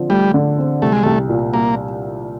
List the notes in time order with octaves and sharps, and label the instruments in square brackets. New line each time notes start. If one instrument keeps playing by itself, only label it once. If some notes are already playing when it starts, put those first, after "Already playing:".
Already playing: [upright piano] D3 F3 C4
[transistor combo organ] G3 [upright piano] A3
[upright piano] D3
C4
[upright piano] C2 [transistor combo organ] A3
[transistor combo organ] G#3
[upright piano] C2 [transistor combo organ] A3
[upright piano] A#2
[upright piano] G3 [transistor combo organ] A#3